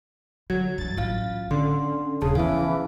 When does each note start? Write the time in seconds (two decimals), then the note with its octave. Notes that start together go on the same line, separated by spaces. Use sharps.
0.50 D3 F#3 G#6
0.78 G2 E3 A6
0.97 A1 F#3 F4 F5
1.51 D3 B3 C#4 C6
2.22 D#1 C#3 G#4 A5
2.35 E3 F3 B3 F5 G#5